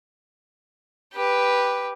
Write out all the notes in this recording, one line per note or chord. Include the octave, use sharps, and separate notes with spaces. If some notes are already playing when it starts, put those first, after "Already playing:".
G4 B4